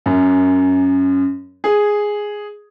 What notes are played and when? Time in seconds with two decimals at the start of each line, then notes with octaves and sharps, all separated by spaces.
0.06 F#2
1.64 G#4